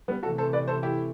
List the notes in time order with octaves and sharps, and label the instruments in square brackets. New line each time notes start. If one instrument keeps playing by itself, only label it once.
[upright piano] G3 B3
[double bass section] C3 E3 A3 [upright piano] F#4 A4
[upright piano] A4 C5
B4 D5
A4 C5
E4 G4